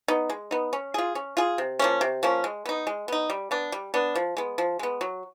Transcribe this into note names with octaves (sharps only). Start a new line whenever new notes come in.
B3 D#4
G#3
B3 D#4
C#4
F4 G#4
C#4
F4 G#4
C3
F3 A#3 C#4
C3
F3 A#3 C#4
G#3
B3 D#4
G#3
B3 D#4
G3
B3 D4
G3
B3 D4
F3
G#3 B3
F3
G#3 B3
F#3